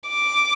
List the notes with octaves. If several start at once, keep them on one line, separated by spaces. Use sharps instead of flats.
D6